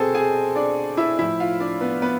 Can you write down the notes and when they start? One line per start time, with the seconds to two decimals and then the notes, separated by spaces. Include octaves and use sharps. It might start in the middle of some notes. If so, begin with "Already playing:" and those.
Already playing: B2 C4 G#4 A4 C5 G#5 A5
0.15 G#4 G#5
0.56 D4 D5
0.97 E4 E5
1.19 A2 F3 E4 E5
1.40 F4 F5
1.60 D4 D5
1.81 B3 B4
2.02 B3 B4